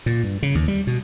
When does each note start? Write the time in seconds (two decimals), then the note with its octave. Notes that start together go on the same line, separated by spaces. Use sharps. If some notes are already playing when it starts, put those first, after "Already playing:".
0.06 A#2
0.23 G2
0.43 C#3
0.55 D#2
0.68 G3
0.87 B2